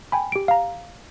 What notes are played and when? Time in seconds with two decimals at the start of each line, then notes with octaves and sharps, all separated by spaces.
0.12 G5 G#5 B5
0.32 G4 D7
0.48 F5 A#5